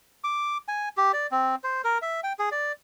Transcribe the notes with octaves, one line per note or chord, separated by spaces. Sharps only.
D6
G#5
G4
D5
C4
C5
A#4
E5
G5
G#4
D5